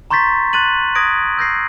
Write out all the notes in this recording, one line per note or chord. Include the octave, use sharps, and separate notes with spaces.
A#5 C6 C#6 G6 A6 B6
C6 F#6 A6 D#7 F#7
D#6 G#6 A#6 D7
E6 G6 A#6 C7